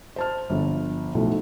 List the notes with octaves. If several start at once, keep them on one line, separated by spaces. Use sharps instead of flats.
C5 A5 F6
G1 F3
B1 A2 F3 A3